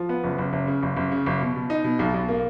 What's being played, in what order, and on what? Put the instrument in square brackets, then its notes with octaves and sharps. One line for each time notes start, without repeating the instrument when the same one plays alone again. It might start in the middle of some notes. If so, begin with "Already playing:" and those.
Already playing: [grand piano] F3
B3
F#1
F#1
F#1
C#3
F#1
F#1
C#3
F#1
B2
B2
D#4
B2
B1
B1
A#3